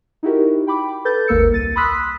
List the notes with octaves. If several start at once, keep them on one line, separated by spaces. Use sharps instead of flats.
D#4 E4 F#4 G4 A#4
G5 B5 D6
A4 B4 G6 A6
G#1 D#2 A#3 A#4 E6 C#7
C2 A6 D#7
B5 C6 D#6 E6 F#6 B6